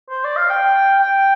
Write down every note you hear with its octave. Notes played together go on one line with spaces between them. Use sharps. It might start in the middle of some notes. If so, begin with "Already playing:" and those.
C5
D5
F5
G5
G5